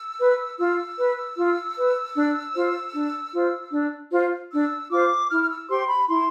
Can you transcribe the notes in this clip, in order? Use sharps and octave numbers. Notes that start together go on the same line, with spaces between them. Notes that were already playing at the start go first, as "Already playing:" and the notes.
Already playing: E6
B4
F4 E6
B4
F4
B4
D4
F4 C5
D4
F4 C5
D4
F4 C5
D4 E6
F4 C5 D6
E4 F6
F6
E6
G4 C5 C6
B5
E4 C6